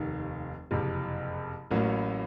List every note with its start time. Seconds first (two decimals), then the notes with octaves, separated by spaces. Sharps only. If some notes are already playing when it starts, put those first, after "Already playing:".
Already playing: F1 D#2 D#3
0.71 F#1 F2 C3
1.71 A1 A2 F#3 A#3 C#4